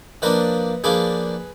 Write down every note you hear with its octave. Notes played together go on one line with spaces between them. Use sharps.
F3 A#3 D4 B4 D#5
F3 A#3 D4 G#4 B4